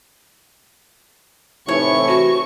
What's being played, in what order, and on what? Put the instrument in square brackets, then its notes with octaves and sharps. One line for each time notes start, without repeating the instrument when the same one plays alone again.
[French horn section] A2 C3 E3 [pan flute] D#4 [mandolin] C#5 [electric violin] C#6
[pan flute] F#4